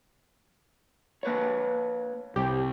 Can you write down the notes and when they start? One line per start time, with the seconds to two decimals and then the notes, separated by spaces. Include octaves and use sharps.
1.23 A#3 B4 C#5
2.36 C2 G4